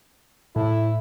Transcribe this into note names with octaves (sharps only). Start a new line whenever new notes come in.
A2 E4